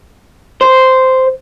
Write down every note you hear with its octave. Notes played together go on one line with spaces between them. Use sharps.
C5